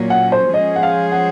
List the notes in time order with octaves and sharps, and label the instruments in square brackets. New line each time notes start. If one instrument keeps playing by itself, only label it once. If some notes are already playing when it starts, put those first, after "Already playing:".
Already playing: [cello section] A#2 F#3 A#3 C#4
[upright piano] F#5
C5
[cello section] F3 G#3 C#4 G#4 C5 [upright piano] D#5
[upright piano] F#5
F5
F#5